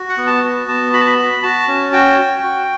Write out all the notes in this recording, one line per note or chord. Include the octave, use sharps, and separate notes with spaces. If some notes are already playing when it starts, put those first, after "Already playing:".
Already playing: F#4
F#5
B3
A5
F#4
B3 A5
F#4 B5
A5
B5
F#4
F#4 A5
C#4
F#4 G5
F#4
F#4